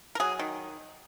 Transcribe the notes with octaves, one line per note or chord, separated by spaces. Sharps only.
A#4
F#3 G#4
D#3